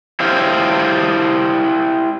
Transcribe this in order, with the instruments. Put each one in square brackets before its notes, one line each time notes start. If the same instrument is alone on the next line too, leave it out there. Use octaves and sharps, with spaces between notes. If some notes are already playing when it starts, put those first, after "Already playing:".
[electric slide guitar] E4 G4 C5 F5